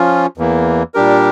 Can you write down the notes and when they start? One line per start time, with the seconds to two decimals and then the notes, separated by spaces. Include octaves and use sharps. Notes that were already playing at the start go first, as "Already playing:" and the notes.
Already playing: F3 C#4 F4
0.37 E2 E3 A#3
0.94 A#2 G3 D4 G4 A#4